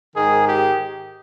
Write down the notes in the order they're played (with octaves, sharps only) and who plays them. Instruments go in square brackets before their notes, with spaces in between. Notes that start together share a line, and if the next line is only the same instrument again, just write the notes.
[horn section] G#2 D#3 G#4
G4